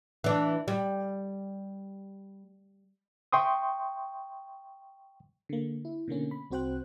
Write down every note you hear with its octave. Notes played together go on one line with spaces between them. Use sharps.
E3 D4
G3
E5 G5 C6 C#6 D#6
D3 A#3
E4
B2 D3 A#3 C#4
B5
C2 C4 F#4 C5 G5 F#6